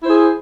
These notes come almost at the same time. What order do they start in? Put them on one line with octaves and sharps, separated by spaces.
E4 C5 G#4